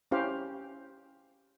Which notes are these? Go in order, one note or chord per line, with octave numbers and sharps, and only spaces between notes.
C#4 E4 G4 C5 F5